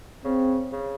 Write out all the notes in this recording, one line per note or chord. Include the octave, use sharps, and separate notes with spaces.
C#3 C4
C#3